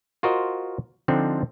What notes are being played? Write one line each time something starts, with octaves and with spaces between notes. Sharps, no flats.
F4 F#4 A#4 C5 D#5
D3 F3 C4 D4 D#4